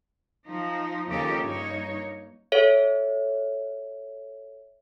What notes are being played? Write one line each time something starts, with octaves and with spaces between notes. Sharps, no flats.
F3 D#4
D#2 C#3 F3 D#4 G4 A4
G2 A#3 D#4 C#5
A4 C#5 E5